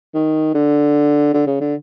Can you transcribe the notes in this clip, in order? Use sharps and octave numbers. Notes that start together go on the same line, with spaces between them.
D#3
D3
D3
C#3
D3